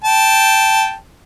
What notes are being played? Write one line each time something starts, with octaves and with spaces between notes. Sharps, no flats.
G5 A5